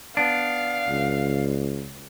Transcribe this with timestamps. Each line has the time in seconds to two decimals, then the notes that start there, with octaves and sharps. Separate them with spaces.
0.17 B3 D4 F5
0.89 C#2